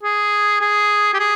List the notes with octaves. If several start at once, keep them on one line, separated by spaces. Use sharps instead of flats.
G#4
G#4
G4
G#4